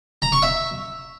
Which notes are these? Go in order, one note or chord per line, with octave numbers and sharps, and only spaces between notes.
A#5
C#6
E5